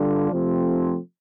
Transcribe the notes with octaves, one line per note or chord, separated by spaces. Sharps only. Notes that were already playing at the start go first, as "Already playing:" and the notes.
Already playing: G2 D3 G3 D4 F4
C3 F3 A3 C4